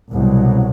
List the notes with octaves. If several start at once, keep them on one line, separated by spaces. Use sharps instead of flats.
C2 B2 F#3